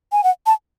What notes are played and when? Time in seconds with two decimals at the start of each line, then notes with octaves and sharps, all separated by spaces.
0.12 G#5
0.24 F#5
0.46 A5